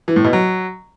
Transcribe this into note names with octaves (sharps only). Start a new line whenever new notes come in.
E3
A2
B2
F#3